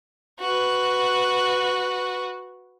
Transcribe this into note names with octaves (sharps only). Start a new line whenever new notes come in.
F#4 B4